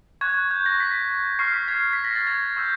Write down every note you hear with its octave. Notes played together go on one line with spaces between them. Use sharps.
C#6 F#6 G#6
G6
A#6
B6
C#6 F6 C7
B6
G#6
B6
A#6
A6
G#6
C#6 E6 G6